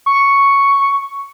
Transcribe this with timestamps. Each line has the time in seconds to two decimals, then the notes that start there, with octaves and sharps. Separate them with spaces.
0.06 C#6